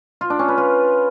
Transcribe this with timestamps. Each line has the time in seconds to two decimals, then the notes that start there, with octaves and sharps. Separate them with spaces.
0.21 F4
0.30 D4
0.39 C#4
0.48 B4
0.58 F4